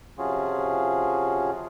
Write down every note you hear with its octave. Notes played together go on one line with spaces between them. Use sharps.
C3 F3 C#4 F4 F#4 G#4